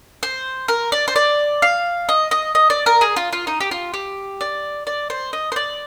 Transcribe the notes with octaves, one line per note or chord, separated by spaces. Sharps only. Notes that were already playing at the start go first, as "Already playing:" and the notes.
C5
A#4
D5
C5
D5
F5
D#5
D#5
D#5
D5
A#4
G#4
F4
F4
D#4
G4
F4
G4
D5
D5
C5
D#5
C5
D5